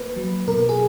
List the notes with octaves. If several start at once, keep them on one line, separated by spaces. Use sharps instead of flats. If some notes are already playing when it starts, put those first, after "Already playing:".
Already playing: A#3 B4
F#3
B2 A#4
G#4